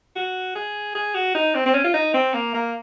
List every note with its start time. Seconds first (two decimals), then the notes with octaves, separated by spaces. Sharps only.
0.16 F#4
0.55 G#4
0.95 G#4
1.15 F#4
1.35 D#4
1.55 C4
1.66 C4
1.74 C#4
1.84 F4
1.94 D#4
2.14 C4
2.34 A#3
2.54 A#3